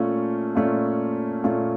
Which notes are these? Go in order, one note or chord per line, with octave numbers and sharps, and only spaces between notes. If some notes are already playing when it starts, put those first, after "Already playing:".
Already playing: A#2 A3 C#4 F4
A#2 A3 C#4 F4
A#2 A3 C#4 F4